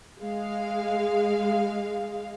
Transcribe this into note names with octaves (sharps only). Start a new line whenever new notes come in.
G#3 F5